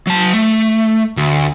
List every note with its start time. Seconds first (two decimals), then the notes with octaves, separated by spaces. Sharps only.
0.07 F#3 A5
0.33 A3
1.17 D2